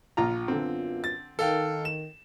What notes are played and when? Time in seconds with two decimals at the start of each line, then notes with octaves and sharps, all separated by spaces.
0.17 A#1 F4 A#5
0.48 F#2 D3 B3 C4 F4
1.04 A6
1.39 D#3 A4 F5 G5
1.85 E7